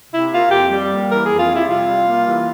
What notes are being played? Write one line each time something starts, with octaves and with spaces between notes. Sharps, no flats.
C3 E4
A#3 F4
F2 G4
G3
A#3
E3 A#4
F2 G#4
F4
G3 E4
C3 F4
G3
A#3
E3